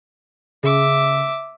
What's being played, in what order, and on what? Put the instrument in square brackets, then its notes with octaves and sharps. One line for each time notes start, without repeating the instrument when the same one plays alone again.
[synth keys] C#3 [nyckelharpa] E5 D6